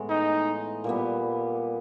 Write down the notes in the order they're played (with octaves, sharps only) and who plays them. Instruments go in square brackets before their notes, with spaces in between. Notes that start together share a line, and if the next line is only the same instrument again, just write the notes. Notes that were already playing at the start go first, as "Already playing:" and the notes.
Already playing: [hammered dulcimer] A2 E3 G#3 B3
[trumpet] D#4
[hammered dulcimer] A#2 G3 B3